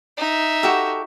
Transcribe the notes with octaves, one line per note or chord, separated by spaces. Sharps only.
D#4 E5
F#4 G4 A4